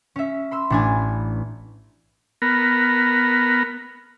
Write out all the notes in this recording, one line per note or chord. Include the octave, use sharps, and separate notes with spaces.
C#4 E5
B5 C6 E6
A1 D4 G#5
B3 A#4